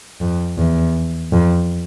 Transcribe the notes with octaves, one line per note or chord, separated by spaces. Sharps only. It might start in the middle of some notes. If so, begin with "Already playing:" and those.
F2
E2
F2